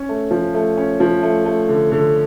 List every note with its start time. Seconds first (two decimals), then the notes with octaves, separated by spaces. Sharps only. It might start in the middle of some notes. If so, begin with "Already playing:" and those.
Already playing: C#4
0.09 A3
0.31 F3
0.54 A3
0.77 C#4
1.00 F3
1.23 A3
1.46 A3
1.69 D3
1.92 D3